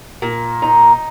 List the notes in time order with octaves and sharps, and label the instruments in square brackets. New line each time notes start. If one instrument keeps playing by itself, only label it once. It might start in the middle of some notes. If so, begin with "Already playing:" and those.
[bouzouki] A#2
D#4